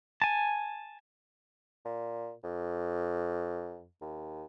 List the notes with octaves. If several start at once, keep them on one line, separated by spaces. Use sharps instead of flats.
G#5 A5
A#2
F2
D#2